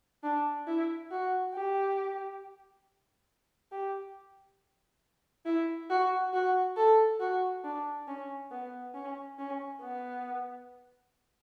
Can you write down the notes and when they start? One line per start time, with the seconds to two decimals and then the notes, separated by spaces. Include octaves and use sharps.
0.23 D4
0.67 E4
1.11 F#4
1.54 G4
3.72 G4
5.46 E4
5.90 F#4
6.33 F#4
6.77 A4
7.20 F#4
7.64 D4
8.07 C#4
8.51 B3
8.94 C#4
9.39 C#4
9.82 B3